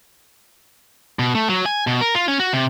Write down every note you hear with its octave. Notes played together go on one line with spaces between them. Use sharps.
B2
A3
F#3
G#5
B2
A#4
F4
C#4
F#4
C3